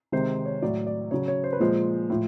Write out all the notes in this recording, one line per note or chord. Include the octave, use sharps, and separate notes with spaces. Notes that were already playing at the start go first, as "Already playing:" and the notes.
C3 D#3 G#3 C5
C#5
A2 F#3 D5
D5
C#3 F#3 C#5
C#5
C5
B4
A#2 F3 G#3 C5
A2 F3